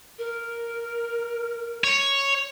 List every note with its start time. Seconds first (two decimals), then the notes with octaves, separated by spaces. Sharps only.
0.18 A#4
1.84 C#5